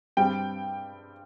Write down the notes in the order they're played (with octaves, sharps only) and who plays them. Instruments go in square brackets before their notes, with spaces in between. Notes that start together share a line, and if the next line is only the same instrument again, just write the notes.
[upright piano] G2 G3 C4 G5